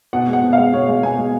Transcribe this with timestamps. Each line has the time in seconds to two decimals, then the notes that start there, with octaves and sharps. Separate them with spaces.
0.13 B2 F#5
0.28 G#3
0.33 F#5
0.44 B2
0.53 F5
0.58 G#3
0.73 B2 C#5
0.88 G#3
1.03 B2 G#5
1.18 G#3